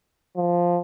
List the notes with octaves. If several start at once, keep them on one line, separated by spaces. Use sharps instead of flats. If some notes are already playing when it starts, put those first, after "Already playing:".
F3